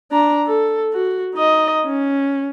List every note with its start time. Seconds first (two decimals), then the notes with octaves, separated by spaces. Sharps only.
0.11 D4 A#5
0.47 A4
0.94 F#4
1.35 D#4 D#5
1.86 C#4